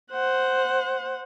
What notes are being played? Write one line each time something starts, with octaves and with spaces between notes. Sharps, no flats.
C5 F#5